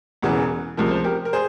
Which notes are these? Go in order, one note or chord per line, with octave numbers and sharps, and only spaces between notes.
E1 E2 C#3 E3
C#2 C3 F3 A#4
C5
G4 A#4
A#4
G#4 C5